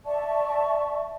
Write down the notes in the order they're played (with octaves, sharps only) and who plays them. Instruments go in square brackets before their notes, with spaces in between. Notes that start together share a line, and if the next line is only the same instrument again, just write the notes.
[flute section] D5 E5 A5 C#6